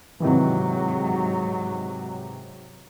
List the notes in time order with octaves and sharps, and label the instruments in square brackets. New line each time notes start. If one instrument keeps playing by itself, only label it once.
[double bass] G#2 F#3 [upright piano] C3 D#3 E3